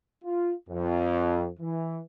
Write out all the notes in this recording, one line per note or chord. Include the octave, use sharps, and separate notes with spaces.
F4
F2
E3